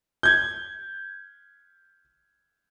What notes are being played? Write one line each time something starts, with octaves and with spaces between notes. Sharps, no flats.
G6 G#6